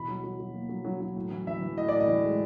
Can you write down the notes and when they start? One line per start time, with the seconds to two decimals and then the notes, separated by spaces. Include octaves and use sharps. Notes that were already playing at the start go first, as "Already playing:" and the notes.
Already playing: B2 E3 B5
0.08 F#3
0.24 F#3
0.40 F#3
0.54 A#3
0.69 F#3
0.85 F#3
1.01 F#3
1.16 A2
1.31 E3
1.47 E3 E5
1.61 E3
1.77 A2 D#5
1.88 A2 D5
2.00 D#5
2.08 E3
2.23 G#3